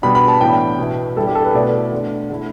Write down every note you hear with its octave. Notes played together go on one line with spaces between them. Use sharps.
B2 G3 B3 D4 B5
B5
A5
A2 E3 B3 D4 G5
B2 B3 E4
D3 G3 E4 A4
G4
A4
B4
B2 A3 E4 D5
D3 A3 D4
D3 A3 E4